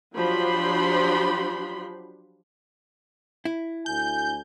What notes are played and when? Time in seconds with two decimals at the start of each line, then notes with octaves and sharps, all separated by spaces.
0.15 F3 F#3 D4 G4 B5 C6
3.45 E4
3.86 D2 G#5 G6